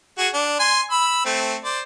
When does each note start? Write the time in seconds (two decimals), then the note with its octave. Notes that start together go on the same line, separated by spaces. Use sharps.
0.18 F#4 G#4
0.34 D4
0.60 G#5 C6
0.91 B5 E6
1.25 A3 C4
1.65 C5 D5